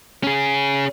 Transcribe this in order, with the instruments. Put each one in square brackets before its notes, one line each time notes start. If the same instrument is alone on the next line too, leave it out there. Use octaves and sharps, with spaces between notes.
[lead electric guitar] C#4 G#4